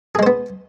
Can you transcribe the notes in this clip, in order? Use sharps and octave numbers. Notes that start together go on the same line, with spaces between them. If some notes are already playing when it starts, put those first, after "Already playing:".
G#3 B3 G#4 C5